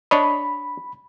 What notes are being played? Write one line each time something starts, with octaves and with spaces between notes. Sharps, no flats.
D4 C#5 D#5 B5